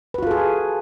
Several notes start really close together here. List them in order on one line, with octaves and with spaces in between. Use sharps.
B4 F#4 F4 A4 G#4